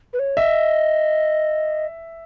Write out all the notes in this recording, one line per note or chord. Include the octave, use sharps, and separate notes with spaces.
B4
C#5
D#5 E5